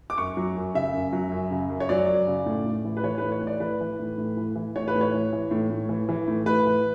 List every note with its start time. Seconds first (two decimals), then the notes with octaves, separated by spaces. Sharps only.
0.10 D6
0.17 F#2 C#6
0.37 F#3
0.56 F#2
0.74 C#3 E5
0.93 F#2
1.13 F#3
1.31 F#2
1.51 C#3
1.70 F#2
1.80 C#5
1.89 F#3 D5
2.08 F#2
2.27 C#3
2.46 A2
2.66 A2
2.85 E3
2.97 B4
3.03 E3 C#5
3.18 A2 B4
3.32 C#5
3.41 A2
3.47 D5
3.60 E3 B4
3.80 E3
3.99 A2
4.18 A2
4.37 E3
4.56 E3
4.75 A2 C#5
4.88 B4
4.95 A2
5.01 C#5
5.14 E3
5.33 E3
5.51 A2
5.70 A2
5.89 E3
6.09 E3
6.28 A2
6.46 A2 B4
6.66 E3